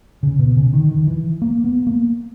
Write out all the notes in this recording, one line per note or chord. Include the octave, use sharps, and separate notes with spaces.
C#3
B2
C#3
D#3
D#3
E3
A#3
B3
A#3